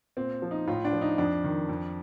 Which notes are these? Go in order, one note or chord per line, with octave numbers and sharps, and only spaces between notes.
A#2 C4
F3
D#4
A2 F4
D4
F3
D#4
F2 D4
D#3
F2